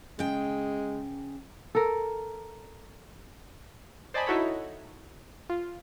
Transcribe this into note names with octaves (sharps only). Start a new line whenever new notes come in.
C#3 G#3 G5
A4 A#4
C5 D5 D#5 G#5 A5 B5
D#4 E4 F#4 A4 C#5 B5
F4